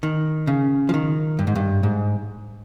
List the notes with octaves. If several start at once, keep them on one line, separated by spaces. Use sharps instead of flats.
D#3
C#3
F3
D#3
G2
G#2
G2
G#2